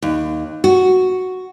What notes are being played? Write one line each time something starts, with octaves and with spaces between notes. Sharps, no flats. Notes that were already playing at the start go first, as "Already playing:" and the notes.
D#2
F#4